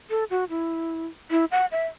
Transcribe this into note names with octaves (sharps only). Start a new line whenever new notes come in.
A4
F#4
E4
E4
F#5
E5